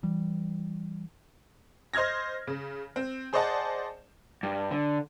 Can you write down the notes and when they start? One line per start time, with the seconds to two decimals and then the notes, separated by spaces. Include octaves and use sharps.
0.03 E3 G3
1.93 C5 D#5 F6 G#6 A#6
2.47 C#3
2.96 C4
3.33 G#4 C5 D5 D#5 F#5 A5
4.43 G2
4.71 D3